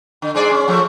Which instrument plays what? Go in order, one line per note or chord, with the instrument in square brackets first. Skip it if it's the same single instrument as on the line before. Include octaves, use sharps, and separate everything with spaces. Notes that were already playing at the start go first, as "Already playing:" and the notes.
[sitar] D3
G#2 G#4 D5
C#4
F3 A3